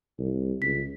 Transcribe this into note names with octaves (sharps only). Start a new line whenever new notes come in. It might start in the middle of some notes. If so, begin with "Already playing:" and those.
C2
C#2 B6